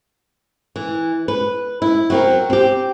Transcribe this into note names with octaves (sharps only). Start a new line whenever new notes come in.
E3
B4
E4
F#3 C4 A#4
C4 G4